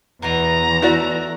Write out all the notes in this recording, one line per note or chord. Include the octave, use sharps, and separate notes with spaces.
E2 B2 E3 A#5
A3 E4 F#4 D5